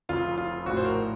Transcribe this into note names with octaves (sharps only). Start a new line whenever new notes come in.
F1 F2 C#3 F3 F4
F4
A#1 A2 F3 F#4
C5
A#4